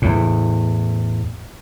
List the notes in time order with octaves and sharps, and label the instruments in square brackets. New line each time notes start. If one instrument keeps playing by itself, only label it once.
[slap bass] E2 A2